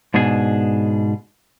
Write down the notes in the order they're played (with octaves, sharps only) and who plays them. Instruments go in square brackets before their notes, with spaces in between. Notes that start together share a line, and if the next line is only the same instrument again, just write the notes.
[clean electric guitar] G#2 B2 D4 G#4